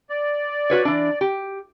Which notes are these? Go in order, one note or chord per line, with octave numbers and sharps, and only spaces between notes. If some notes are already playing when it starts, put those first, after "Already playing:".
D5
F#4 B4 C#5
E3 D4
G4